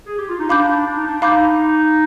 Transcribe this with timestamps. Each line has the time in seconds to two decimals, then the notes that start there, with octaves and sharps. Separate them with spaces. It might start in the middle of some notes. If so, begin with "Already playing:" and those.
0.06 G#4
0.17 G4
0.28 F4
0.39 D#4
0.49 D4 F5 B5 D6 G6
0.86 D4
0.96 D#4
1.07 D4
1.22 D#4 F5 B5 D6 G6